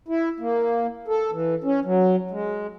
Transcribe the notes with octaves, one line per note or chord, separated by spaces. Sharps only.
E4
A#3
A4
E3
C#4
F#3
G#3